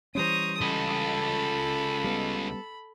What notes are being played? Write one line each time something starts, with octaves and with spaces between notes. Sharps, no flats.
E3 G3 C#4 C5 A#5 C#6 D#6
C#2 A4 D#5 B5
G3 B3